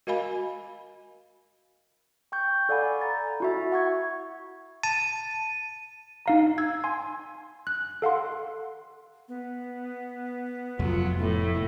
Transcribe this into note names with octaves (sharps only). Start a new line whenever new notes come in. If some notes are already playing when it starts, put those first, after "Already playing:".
F#4 A#4 D#5 F5 G#5 B5
G5 C#6 G6
A4 D5 F5 F#5 G#5 B5
A#5 A6
E4 F#4 E5
F#5 C#6 G#6
A5 D#7
D#4 F5 A#5
E6 G#6
G#5 C6
F#6
A4 F5 F#5 C6
B3
F1 F2 F#3 A3 F4
A2 E4